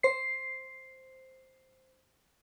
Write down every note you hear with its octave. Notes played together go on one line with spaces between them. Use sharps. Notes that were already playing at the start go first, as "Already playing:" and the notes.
C5 C7